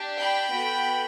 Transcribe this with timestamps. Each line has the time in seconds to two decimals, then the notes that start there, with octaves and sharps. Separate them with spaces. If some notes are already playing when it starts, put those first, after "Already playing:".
Already playing: D4 G4
0.19 G5 B5
0.52 B3 F#4 A4